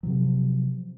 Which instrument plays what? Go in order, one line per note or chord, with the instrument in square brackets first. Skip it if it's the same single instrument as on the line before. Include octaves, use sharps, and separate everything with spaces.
[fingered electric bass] C3 F3 F#3